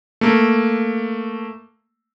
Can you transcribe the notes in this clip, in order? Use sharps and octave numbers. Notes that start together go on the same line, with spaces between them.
A3 A#3